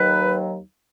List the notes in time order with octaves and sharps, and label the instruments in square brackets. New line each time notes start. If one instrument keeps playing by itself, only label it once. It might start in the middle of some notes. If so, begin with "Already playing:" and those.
Already playing: [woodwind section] D#2 D#3 F#3 B4